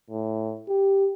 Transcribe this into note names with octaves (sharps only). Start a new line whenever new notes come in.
A2
G4